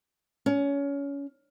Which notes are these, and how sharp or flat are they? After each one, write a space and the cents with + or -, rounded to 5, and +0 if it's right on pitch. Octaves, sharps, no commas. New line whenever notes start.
C#4 +25